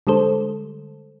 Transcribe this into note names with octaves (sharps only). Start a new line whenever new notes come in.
D3 G3 G#3 A4 C5